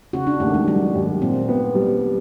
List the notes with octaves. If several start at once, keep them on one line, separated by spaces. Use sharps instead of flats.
C#3 F#4
D4
D#2 A3
G#3
F#3 G3
D#2
A#2 C4
B3
G3